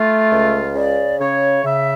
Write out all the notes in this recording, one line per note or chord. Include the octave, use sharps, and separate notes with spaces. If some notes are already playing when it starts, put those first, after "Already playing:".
Already playing: A3 F4
C#2
C#3 D5
C#3 C#5
C#3 E5